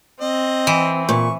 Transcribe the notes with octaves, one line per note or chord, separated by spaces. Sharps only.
C4 D#5
E3
A#2 C#6